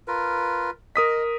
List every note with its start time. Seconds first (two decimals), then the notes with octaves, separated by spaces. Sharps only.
0.08 F4 A#4 B4
0.96 A#4 D#5 D#6 B6